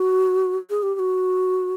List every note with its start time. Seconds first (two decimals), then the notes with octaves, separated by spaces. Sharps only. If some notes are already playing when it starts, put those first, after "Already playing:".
Already playing: F#4
0.70 G#4
0.83 G4
0.95 G4
0.99 F#4